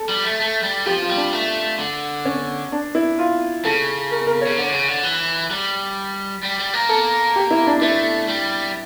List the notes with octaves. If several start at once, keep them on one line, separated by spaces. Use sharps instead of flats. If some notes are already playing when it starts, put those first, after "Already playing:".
Already playing: A4
G3
A3
A3
G3
F3 G4
F4
G3
D4
A3
D3
C#4
D4
E4
F4
C#3 A4
A#4
A#4
C#5
C#3
D3 C#5
C#3
D3
E3
G3
G3
G3
A#3
A4
G4
E4
D4
A3 E4
G3